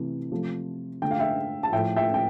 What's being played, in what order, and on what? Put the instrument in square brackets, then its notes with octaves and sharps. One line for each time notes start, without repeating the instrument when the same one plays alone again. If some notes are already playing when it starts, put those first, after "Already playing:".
Already playing: [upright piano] C3 E3 A3
C3 F3 A3
D3 A3 G5
F5
E5 G5
A5
A2 F3 A3 E5 G5
E5 G5
G5